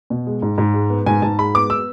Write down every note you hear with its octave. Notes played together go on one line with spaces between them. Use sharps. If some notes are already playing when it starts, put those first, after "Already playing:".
B2
G#3
G#2
G#2
G#3
B3
G#2 G#5
G#2 A5
G#3 B5
B3 D6
E6